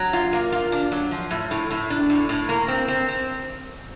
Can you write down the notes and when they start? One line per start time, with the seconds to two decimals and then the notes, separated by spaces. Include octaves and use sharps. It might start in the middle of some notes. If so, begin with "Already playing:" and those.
Already playing: F#3
0.13 F4
0.33 A#3
0.52 F4
0.72 D4
0.92 F#3
1.11 F3
1.31 A2
1.51 A2
1.71 A2
1.90 D4
2.10 A2
2.29 A2
2.49 A#3
2.68 C4
2.88 C4
3.08 C4